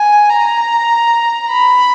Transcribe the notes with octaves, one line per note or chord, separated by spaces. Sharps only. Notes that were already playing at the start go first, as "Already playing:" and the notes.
Already playing: G#5
A#5
B5